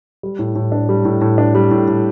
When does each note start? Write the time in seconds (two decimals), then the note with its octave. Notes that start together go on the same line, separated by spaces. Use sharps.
0.23 G3
0.39 A2
0.55 A2
0.72 D4
0.89 G3
1.05 A2
1.21 A2
1.38 D4
1.55 G3
1.71 A2
1.88 A2